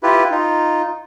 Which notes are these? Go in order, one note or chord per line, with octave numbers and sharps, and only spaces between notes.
E4 F4 G4 B4
D#4 F4